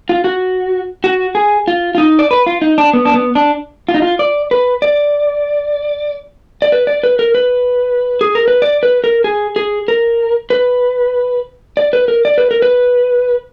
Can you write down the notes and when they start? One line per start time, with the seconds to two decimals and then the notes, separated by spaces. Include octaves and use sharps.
0.09 F4
0.24 F#4
1.04 F#4
1.35 G#4
1.68 F4
1.95 F4
1.98 D#4
2.19 D5
2.31 B4
2.46 F4
2.62 D#4
2.78 D4
2.93 B3
3.05 D4
3.14 B3
3.35 D4
3.89 F4
3.94 D#4
4.02 F4
4.19 D5
4.51 B4
4.82 D5
6.62 D5
6.72 B4
6.87 D5
7.03 B4
7.19 A#4
7.35 B4
8.21 G#4
8.35 A#4
8.48 B4
8.62 D5
8.83 B4
9.04 A#4
9.24 G#4
9.56 G#4
9.88 A#4
10.50 B4
11.77 D5
11.93 B4
12.08 A#4
12.25 D5
12.38 B4
12.51 A#4
12.62 B4